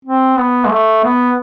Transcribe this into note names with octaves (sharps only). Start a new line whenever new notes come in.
C4
B3
G#3
A3
B3